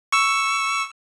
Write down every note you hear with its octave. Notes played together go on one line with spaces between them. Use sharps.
C#6 E6